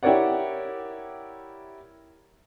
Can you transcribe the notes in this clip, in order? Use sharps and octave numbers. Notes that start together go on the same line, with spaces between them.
E4 G4 A#4 C#5 D5 F#5